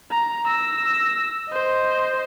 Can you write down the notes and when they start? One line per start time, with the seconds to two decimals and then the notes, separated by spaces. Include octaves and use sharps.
0.12 A#5
0.47 E6 A#6
1.50 C5 D#5